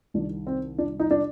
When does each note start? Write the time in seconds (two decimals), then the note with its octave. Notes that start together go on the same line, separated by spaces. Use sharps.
0.14 C2 C3 D#3 D4
0.47 C4
0.78 D4
1.00 D#4
1.11 D4